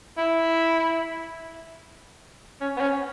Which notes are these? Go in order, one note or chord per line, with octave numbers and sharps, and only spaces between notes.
E4
C#4
B3
C#4